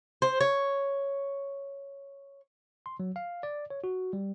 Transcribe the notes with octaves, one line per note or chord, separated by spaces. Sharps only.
C5
C#5
C6
F#3
F5
D5
C#5
F#4
G3